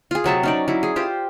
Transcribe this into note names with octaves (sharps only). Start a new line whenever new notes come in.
F4 G#4
C3 F#3 E5 A5
C#4 D#4 D5
F#3 E4
G#4
F4 G4 C5